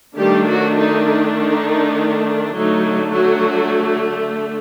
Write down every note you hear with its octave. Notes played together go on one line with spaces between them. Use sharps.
D#3 G3 A3 D4 G4
F#3 F#4
D#4
D#4
D3 F#3 A3 D#4
F#3 F#4